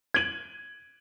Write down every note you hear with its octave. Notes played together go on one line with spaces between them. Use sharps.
G#6 D7 D#7 F#7